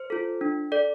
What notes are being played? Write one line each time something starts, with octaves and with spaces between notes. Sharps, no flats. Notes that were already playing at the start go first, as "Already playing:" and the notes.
Already playing: C5
F4 A4
D4
A4 D5